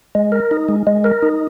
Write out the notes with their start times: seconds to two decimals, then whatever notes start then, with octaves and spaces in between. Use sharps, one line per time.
0.15 G#3
0.32 A#4
0.51 D#4
0.69 G#3
0.87 G#3
1.04 A#4
1.22 D#4